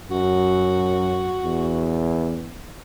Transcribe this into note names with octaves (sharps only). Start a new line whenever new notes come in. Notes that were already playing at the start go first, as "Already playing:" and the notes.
F#2 F#4
E2